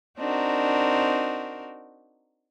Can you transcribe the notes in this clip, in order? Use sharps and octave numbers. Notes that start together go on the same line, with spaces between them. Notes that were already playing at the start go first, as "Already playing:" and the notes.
C4 D4 D#4 F#4 A#4